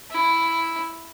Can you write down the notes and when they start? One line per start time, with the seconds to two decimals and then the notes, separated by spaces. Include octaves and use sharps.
0.11 E4